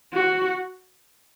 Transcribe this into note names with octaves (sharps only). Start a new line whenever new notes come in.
F#4